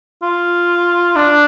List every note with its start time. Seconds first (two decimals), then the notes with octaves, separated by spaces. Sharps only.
0.23 F4
1.16 D4